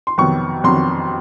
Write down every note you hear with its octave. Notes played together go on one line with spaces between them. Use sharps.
C6
F2 C3 D#3 F#3 B3 C#6
F2 C3 D#3 F#3 B3 C6